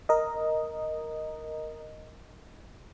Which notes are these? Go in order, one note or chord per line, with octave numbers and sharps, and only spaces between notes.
A#4 D#5